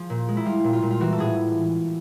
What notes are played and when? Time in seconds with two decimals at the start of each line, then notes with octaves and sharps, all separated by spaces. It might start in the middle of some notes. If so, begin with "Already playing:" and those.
Already playing: F3 G#4
0.10 A#2
0.28 G#3
0.37 E4
0.45 G3 F4
0.64 A#2
0.73 F4
0.83 A#2
0.91 F4
1.00 E3 F#4
1.12 A4
1.18 A2 G#4